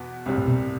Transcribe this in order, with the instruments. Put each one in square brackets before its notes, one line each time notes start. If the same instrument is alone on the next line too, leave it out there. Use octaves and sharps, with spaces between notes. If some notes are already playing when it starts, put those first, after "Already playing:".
Already playing: [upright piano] E2 B2 B3
C2 C3 G3
[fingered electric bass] A2
B2